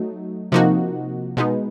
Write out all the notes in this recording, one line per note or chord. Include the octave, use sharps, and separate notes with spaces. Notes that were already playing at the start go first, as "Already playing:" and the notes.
Already playing: F#3 A3 D#4
C3 F3 A#3 D#4 F#4
B2 G#3 B3 D#4